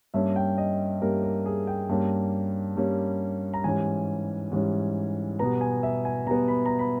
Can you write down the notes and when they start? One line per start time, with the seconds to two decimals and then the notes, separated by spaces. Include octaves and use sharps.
0.14 G2 G3 A#3 C#4 E5
0.36 G5
0.58 D#5
1.02 G2 G3 A#3 C#4 A#4
1.23 A#4
1.46 G#4
1.67 G5
1.89 G2 G3 A#3 C#4
2.77 G2 G3 A#3 C#4
3.54 A#5
3.64 G#2 E3 G3 C#4 G#5
4.51 G#2 E3 G3 C#4
5.39 B2 G3 B3 A#5
5.61 G#5
5.83 E5
6.05 G#5
6.27 B2 G3 B3 A#5
6.48 B5
6.66 A#5
6.79 B5